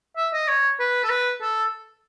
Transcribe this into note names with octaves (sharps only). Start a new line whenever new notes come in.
E5
D#5
C#5
B4
A4
B4
A4